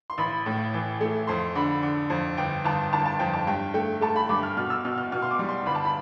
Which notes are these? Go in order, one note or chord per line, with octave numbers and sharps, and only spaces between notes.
C6
A1 B5
A2
E3
A3
F2 C6
D3 B5
D3
F2
G1 G5
G1 A5
G1 A5
A5
F2 G5
A5
G2 G5
A3 G5
A3 A5
B5
G2 D6
F6
B2 F6
E6
B2 F6
F6
B2 F6
C6
D6
G3
C6
G1 B5
A5
B5